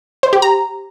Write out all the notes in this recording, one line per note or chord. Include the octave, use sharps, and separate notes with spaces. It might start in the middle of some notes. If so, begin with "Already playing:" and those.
C5
G4
A#5